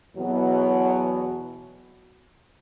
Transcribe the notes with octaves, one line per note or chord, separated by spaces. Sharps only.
E2 B2 F#3